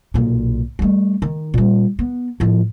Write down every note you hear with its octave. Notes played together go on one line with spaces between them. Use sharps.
B1 A#2
G3 A3
D#3
A#2 G3
B3
A2 F3